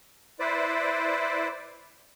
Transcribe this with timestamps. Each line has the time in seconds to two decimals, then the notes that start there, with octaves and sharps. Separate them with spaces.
0.40 E4 B4 C5 D5